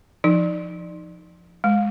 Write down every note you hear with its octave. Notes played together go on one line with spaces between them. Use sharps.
F3 D#4
G#3